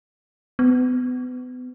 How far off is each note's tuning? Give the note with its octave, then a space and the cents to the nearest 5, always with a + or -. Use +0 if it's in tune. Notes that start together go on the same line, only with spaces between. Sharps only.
B3 +30